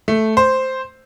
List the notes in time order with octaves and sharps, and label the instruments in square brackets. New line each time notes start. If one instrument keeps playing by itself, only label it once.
[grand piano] A3
C5